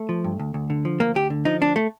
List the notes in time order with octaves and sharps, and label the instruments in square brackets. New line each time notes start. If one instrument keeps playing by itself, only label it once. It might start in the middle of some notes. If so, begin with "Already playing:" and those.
Already playing: [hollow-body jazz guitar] A3
F3
G2
D2
D2
D3
F3
D2 A#3
D2 G4
D3
F3 D#4
D2 D4
A3